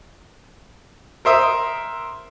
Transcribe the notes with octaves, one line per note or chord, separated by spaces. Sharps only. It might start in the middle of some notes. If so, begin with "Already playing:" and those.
A#4 C5 E5 D#6